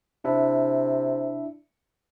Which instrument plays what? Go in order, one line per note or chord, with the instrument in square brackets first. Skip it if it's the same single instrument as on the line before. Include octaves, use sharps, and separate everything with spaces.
[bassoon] C3 [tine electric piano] D4 E4 E5